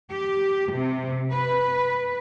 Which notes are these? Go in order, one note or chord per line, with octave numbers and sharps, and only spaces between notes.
G4
C3
B4